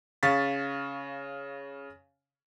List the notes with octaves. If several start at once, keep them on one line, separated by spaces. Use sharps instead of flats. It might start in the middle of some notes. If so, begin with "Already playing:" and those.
C#3 F5 C#6 A6 B6